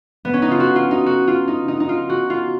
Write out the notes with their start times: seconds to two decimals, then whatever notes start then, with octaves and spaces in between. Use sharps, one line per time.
0.25 B3
0.34 C#4
0.42 D#4
0.51 F4
0.60 F#4
0.76 F4
0.91 D#4
1.06 F#4
1.27 F4
1.48 D#4
1.68 D#4
1.80 D#4
1.89 F4
2.09 F#4
2.30 F4